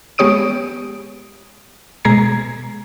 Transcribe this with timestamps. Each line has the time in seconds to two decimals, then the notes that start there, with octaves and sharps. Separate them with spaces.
0.18 G#3 B3 G4 C#5 D#6 D7
2.05 B2 G#3 A#5 G#6 C7